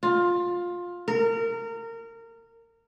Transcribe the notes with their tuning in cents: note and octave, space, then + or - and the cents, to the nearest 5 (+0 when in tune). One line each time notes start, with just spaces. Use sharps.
F4 +15
A#4 -25